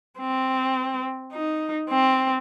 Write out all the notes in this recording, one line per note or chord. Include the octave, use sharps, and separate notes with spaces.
C4
D#4
C4